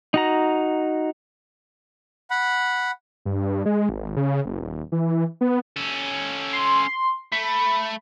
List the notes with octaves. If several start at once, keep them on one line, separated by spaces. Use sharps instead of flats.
D#4 F#4 A#5
F#5 B5
G2
G#3
G#1
C#3
F#1
D#1
E3
B3
C#4 A4
C6
A3 B5